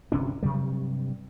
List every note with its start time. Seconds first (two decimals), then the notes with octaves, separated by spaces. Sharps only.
0.12 G1 C3 C#4 D4
0.43 G2 C3 F#3 G3